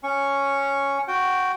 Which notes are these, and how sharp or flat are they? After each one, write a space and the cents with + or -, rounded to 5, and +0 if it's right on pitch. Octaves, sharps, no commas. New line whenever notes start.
C#4 +0 C#6 +0
F#4 +0 G5 -10